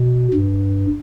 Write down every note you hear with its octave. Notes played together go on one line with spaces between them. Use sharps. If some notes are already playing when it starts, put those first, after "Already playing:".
Already playing: B2
G2